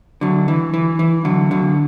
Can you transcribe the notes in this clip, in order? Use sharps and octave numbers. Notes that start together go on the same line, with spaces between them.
D3 F#3
E3
E3
E3
D3 F#3
D3 F#3